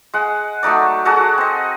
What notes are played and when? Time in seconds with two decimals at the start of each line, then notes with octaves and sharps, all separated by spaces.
0.14 G#3 F#5
0.63 F#3 A3 D#4 D5
1.05 F#4 G#4 A4 F#5
1.38 C4 D#5